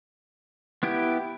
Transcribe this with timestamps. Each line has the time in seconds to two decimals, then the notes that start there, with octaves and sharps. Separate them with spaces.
0.83 B3 E4 G4